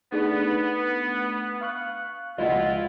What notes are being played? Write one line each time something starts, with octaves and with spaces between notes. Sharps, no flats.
A3 B3 D4 D#4 G#4
F5 C#6 F#6
C#2 F3 G#3 E4 F4 D#5 F#5